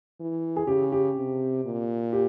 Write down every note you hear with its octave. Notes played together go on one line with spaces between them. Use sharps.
E3
G#4
C#3 G4
G4
C3
A#2
G4